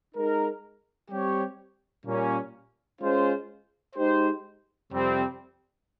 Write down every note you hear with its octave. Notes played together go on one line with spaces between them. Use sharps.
G#3 D#4 A#4
G3 C4 G4 C#5
A#2 G3 A#3 C#4
G#3 C#4 F4 C5
G#3 D#4 G4 C5
F2 C3 G3 C4 G4